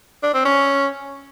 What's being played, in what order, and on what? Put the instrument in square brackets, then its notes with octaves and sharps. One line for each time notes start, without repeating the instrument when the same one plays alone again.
[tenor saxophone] D4
C4
C#4